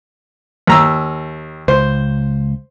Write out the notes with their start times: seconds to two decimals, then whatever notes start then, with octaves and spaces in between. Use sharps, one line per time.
0.67 D#2 A#5 E6
1.68 C#2 C5